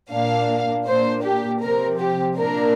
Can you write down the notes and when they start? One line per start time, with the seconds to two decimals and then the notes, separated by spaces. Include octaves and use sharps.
0.10 A#2 A#3 D4 F5
0.86 A#2 A#3 D4 C5
1.24 G4
1.61 C3 F3 C4 A#4
2.00 G4
2.37 A#2 A#3 D4 A#4